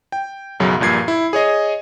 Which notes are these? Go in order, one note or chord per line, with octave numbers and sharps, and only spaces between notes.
G5
B1 F#2 C#3 F#3
A#1 G2 A#2 G#6 C7
E4
G#4 C#5 D#5